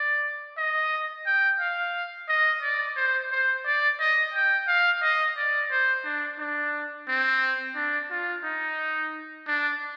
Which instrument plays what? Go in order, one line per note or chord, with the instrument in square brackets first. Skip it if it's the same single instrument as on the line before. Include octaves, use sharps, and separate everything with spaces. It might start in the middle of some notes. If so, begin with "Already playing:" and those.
Already playing: [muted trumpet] D5
D#5
G5
F5
D#5
D5
C5
C5
D5
D#5
G5
F5
D#5
D5
C5
D4
D4
C4
D4
F4
D#4
D4